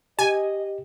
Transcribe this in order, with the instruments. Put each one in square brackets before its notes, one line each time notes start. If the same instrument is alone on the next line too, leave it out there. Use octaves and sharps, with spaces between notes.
[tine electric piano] G4 [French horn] D#5 [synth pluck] G#5